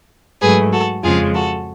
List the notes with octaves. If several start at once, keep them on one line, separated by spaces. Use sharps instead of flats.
G#2 F#3 A3 G#4 B4
F#4 A4
F2 C#3 F3 G#3 F4 G#4
F#4 A4